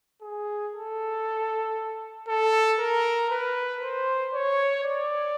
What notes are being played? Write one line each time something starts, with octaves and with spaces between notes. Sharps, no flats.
G#4
A4
A4
A#4
B4
C5
C#5
D5